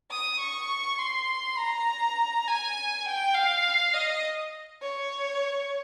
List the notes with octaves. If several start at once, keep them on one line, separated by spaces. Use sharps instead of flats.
D#6
C#6
C6
A#5
G#5
G5
F5
D#5
C#5